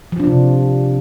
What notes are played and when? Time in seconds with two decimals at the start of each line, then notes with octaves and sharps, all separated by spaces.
0.12 F3
0.20 D4
0.27 C3